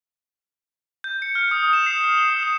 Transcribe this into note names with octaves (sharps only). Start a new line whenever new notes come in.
G6
C#7
F6
D#6
E7
C7
F6
G7
D#6
E7